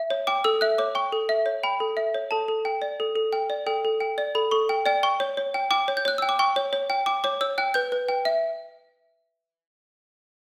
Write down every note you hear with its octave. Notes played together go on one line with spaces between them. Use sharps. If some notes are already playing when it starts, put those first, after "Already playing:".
Already playing: E5
C#5
G5 D6
A4 E6
E5 F#6
C#5 D6
G5 C#6
A4
E5
C#5
G5 B5
A4
E5
C#5
A4 A5
A4
G5
D5
A4
A4
G5
D5
A4 G5
A4
G5
D5
A4 B5
A4 C#6
G5
D5 G5
G5 C#6
C#5
C#5
G5
G5 D6
C#5
G6
C#5 F#6
G5 E6
D6
G5 C#6
C#5
C#5
G5
G5 D6
C#5 D6
C#5 E6
G5 F#6
B4 G6
B4
G5
E5